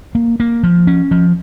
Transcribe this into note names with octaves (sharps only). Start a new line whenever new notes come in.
A#3
A#3
F3
C#4
F3